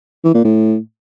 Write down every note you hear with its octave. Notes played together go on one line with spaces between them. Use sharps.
E3
A#2
A2